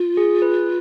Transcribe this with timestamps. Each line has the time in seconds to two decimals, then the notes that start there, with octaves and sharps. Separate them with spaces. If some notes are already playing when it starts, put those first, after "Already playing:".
Already playing: F4
0.17 G#4
0.42 B4